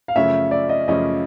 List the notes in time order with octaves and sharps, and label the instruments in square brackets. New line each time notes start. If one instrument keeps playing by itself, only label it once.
[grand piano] F5
[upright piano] F#2 C#3 F3 A3 C#4 [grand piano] E5
[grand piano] D5
D#5
[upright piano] F#2 C#3 F3 A3 C#4 [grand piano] D#5